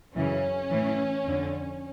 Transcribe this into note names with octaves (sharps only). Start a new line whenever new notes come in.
F#2 C#3 E3 C#4
A2 E3
F2 D3